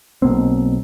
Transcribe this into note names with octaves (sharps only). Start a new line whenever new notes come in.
B1 B2 A#3 C4